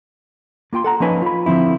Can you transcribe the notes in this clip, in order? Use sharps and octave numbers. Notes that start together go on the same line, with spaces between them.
A#3 F4 G5 C6
A4 F#5 A#5
F3 A#3 C#4 D#4 B4 G#5
F4 B5
D3 F3 C4 E4